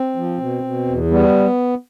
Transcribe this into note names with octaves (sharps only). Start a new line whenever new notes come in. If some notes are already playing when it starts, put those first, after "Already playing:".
Already playing: C4
F3
B2
B2
E2
G3 B3